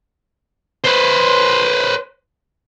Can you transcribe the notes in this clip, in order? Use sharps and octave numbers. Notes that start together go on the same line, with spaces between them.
B4 C5